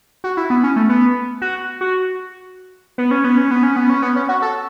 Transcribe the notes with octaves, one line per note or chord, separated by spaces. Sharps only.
F#4
E4
B3
C#4
A3
B3
F#4
F#4
B3
C#4
B3
C#4
B3
C#4
B3
C#4
B3
C#4
F#4
A4